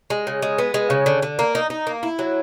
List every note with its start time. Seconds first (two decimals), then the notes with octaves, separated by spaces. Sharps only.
0.10 G#3
0.27 C#3
0.42 G#3
0.58 B3
0.74 G#3
0.90 C#3
1.06 D3
1.23 D3
1.39 A#3
1.55 D#4
1.70 D#4
1.87 A#3
2.03 E4
2.19 F#3